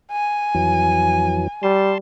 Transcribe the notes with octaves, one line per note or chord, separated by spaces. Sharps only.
G#5
F2 E3 F#3
G3 A5 C6